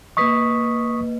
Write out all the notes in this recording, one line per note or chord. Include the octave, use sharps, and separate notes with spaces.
A#3 B4 D#5 C#6 D#6 B6